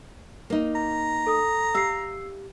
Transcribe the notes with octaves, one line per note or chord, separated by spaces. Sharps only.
A#3 D#4
A#5
A4 D#6
G4 F5 E6 C7